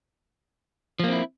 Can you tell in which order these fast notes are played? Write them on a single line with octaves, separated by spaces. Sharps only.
F3 A#3 C4 E4